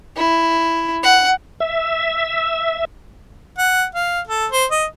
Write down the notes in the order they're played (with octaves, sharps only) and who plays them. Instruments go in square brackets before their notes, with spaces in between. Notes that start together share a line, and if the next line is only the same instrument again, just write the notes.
[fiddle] E4
F#5
[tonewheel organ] E5
[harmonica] F#5
F5
A4
C5
D#5